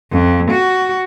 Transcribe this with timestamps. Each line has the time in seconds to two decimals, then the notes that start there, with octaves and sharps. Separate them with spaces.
0.12 F2
0.51 F#4